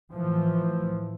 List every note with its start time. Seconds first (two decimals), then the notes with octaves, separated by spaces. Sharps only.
0.13 A2 E3 F3